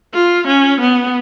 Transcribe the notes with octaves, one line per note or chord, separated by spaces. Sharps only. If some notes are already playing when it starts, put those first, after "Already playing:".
F4
C#4
B3